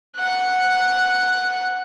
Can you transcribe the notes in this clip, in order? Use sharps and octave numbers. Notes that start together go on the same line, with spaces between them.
F#5 F#6